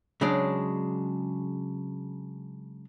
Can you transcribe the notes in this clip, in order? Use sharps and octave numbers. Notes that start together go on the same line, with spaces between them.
C#3 F#3 G#3 D4